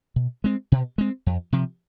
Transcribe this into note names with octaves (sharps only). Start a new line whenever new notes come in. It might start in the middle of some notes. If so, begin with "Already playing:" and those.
B2
G#3 C4
B2
G#3 C4
F2
C3 F3